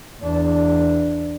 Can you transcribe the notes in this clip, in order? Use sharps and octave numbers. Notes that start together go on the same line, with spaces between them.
E2 D4